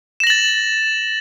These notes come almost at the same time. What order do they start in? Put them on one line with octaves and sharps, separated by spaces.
E7 A#6 F#7 A6